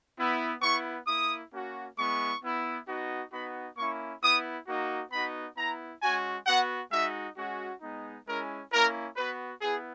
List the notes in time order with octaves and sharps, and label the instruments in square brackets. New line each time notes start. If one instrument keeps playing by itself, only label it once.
[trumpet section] B3 E4
B3 E4 C#6
A#3 E4 D#6
A#3 C#4 F#4
G#3 B3 E4 C#6
B3 E4
B3 D#4 F#4
B3 D#4 F#4 B5
A#3 C#4 E4 C#6
B3 E4 D#6
A#3 D#4 F#4
B3 D#4 F#4 B5
B3 E4 A#5
G#3 C#4 F#4 G#5
B3 F#4 F#5
G#3 D#4 F#4 E5
G#3 C#4 F#4
G#3 B3 D#4
G#3 C#4 E4 A#4
A#3 C#4 E4 A#4
B3 F#4 B4
B3 E4 G#4